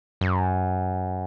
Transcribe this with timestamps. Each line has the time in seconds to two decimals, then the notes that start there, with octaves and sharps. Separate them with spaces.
0.21 F#2